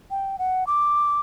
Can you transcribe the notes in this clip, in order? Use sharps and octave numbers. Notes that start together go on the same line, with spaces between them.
G5
F#5
D6